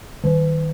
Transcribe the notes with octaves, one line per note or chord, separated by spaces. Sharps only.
D#3